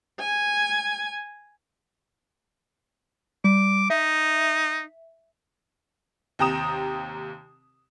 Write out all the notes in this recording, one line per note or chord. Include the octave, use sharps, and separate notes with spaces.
G#5
G3 D6
D#4 E5
D#2 C3 G5 A#5 D#6 E7